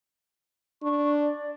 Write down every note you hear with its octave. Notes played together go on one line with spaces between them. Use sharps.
D4 C#6
D5